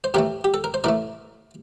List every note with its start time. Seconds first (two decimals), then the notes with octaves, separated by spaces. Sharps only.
0.04 C5
0.14 A2 E3 A3 G4 A#4
0.44 G4
0.54 A4
0.64 A#4
0.74 C5
0.84 A2 E3 A3 A#4 D5